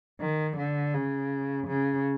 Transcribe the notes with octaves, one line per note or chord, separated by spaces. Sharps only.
D#3
D3
C#3
C#3